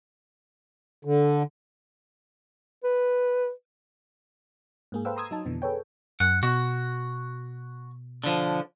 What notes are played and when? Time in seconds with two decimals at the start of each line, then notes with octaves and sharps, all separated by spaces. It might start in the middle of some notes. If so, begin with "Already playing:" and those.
1.05 D3
2.84 B4
4.92 G#2 A#3 G#4
5.05 A4 B4 C5 F5 G5 E6
5.16 A#5 C6 D#6 E6 G#6
5.31 F#3 D#4 A5
5.45 F2 B2 D3 E3
5.62 G#4 A4 B4 C#5 G5
6.20 F#2 F#5
6.43 B2 F#4
8.24 D3 F3